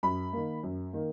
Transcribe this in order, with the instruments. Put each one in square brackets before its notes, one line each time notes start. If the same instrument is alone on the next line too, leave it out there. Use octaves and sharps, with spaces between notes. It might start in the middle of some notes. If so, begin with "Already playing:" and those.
[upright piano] F#2 B5
D#3 A#3
F#2
D#3 A#3